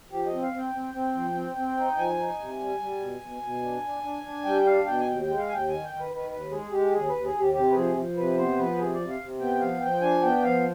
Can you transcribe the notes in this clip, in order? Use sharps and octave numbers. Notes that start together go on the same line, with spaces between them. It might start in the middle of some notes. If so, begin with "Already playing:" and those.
F3 G4
D#5
C4
F5
C4
G5
C4
C4
F3
C4
C4
D#4
F3 G#5
D#4
C3
G3
G3
B2
B2
B2
D4
D4
D4
D4
G3 G5
D4 F5
B2 G5
G#5
D#2 G5
G5
G#3
F5
D#2 G5 G#5
D#3 G#5
G5
D#3
B4
D#3 B4
D#2 B4
G#3 G#4
G#3 G4
D#2 G#4
D#2 B4
G#4
D#2
G4
C3 G4
B4
F3 G#4
F3
C3 B4
B3 C5
F3 B4
C3 G#4
D5
C3
F5
C3
B3 G5
F3 F5
F3 G5
D4 G#5
B3 G5
F3 F5